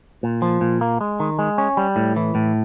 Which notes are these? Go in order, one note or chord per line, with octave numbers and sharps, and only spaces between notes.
A#2
F3
A#2
A#3
G#3
D#3
G#3
C#4
G3
A2
E3
A2